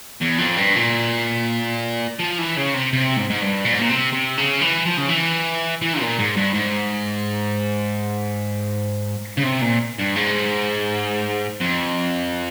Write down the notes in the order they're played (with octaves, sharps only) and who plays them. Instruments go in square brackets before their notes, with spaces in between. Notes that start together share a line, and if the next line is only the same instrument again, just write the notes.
[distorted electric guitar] E2
F2
G2
A#2
F3
E3
C#3
C3
C3
G#2
G#2
G2
A#2
G#2
A#2
C3
C3
C#3
E3
F3
C#3
E3
E3
A#2
G#2
G2
G#2
C#3
C3
A#2
G2
G#2
F2